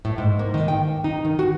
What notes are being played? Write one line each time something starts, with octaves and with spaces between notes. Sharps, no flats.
A2
G#2
A#3
D#3
G5
D#4
D#3
F#4